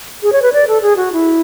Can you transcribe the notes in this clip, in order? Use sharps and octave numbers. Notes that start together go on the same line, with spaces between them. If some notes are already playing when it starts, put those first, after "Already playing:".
G#4
C#5
B4
D5
A4
G#4
F#4
E4